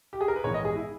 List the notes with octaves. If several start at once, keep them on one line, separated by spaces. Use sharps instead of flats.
G4
G#4
A#4
B4
A#1 G#2 E3 G#3 B3 C#5
D#5
G#4
E4